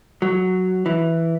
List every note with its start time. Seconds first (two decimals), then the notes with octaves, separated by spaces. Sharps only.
0.22 F#3
0.86 E3